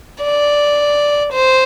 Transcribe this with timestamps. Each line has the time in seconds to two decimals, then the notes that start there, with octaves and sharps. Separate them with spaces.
0.23 D5
1.33 C5